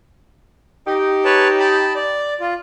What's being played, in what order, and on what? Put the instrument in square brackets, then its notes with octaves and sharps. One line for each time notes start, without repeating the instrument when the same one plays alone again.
[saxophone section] D#4 G4
[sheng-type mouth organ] B4 C#5 A5
A5 B5
D5
F4